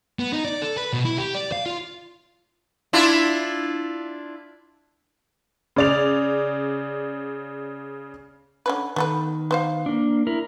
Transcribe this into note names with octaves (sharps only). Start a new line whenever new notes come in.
B3
D#4
D5
A4
B4
B2
E4
G4
D5
F5
F4
D4 E4 F4
C#3 D5 F7
D3 C#4 B4
D#3 B3 A4 B4
B3 C5 F5
A#3 D4
E4 A#4